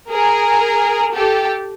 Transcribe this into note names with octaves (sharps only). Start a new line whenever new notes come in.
G#4 A#4
G4 A4